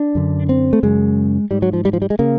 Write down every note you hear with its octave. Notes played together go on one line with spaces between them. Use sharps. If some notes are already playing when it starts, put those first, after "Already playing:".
Already playing: D4
F#2 D3
C4
A3
F#2 C#3 G#3
G#2 G3
F#3
F3
G3
F3
G3
G#3
C#3 A#3